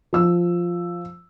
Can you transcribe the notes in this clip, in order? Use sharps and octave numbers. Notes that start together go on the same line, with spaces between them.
F3 E6